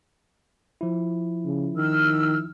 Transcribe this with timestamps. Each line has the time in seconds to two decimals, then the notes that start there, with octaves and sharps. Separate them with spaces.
0.81 F3 E4
1.45 C#3
1.75 D#3 E6 F6